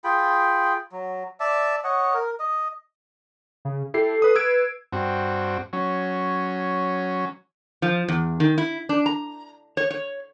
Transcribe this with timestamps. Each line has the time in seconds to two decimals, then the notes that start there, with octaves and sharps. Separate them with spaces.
0.04 F4 G#4 G5 B5
0.92 F#3
1.40 D5 E5 A5
1.84 C#5 D#5 F#5
2.14 A#4
2.39 D#5
3.65 C#3
3.94 E4 G4 A4 C7
4.22 B4 D#6
4.35 B4 E6 G#6 D7
4.92 G2 C4 F#4
5.73 F#3 C#4
7.82 F3
8.09 E2
8.40 D#3
8.58 E4
8.89 D4
9.06 A#5
9.77 C#5
9.91 C#5